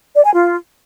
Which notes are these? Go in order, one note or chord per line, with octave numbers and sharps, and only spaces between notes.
D5
G#5
F4